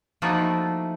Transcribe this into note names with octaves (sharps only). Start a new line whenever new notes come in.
F3 A3 A#3 D#4 E4 F#4